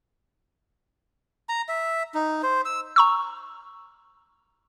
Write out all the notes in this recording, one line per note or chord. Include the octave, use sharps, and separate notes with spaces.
A#5
E5
D#4
C5
E6
A#5 C#6 E6